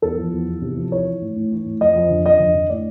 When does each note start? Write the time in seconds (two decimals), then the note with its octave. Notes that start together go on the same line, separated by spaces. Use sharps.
0.02 E2 A4
0.17 F3
0.32 E2
0.48 E2
0.62 C3
0.77 F3
0.92 E3 C#5
1.07 E3
1.21 A2
1.36 A2
1.52 E3
1.66 A2
1.81 F2 D#5
1.96 F2
2.10 D3
2.26 F2 D#5
2.40 D3
2.55 D3
2.70 A2 D5